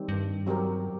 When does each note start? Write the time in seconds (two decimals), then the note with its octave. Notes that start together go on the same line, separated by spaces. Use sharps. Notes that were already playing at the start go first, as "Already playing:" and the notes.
Already playing: D#3 G3 C4
0.09 G2
0.47 F#3 C4 G4 A#4